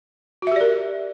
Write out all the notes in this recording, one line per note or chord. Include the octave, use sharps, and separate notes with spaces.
F#4 G4 A#4 D5 E5